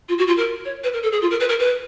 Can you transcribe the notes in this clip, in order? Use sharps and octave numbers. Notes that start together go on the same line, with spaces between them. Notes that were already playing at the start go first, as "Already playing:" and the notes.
F4
F#4
F4
A#4
C#5
B4
A#4
A4
G#4
F4
A#4
B4
A#4
B4